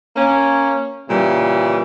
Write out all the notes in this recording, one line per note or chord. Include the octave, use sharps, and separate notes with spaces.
A#3 C#4
A#2 C#3 E3 G3